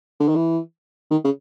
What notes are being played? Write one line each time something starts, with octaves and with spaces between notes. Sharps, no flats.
D3
D#3
E3
D#3
C#3